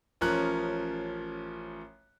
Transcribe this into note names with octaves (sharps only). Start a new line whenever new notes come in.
A1 F3 C#4 A#4 F#6